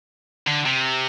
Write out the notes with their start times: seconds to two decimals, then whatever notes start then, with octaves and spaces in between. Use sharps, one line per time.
0.47 D3
0.66 C3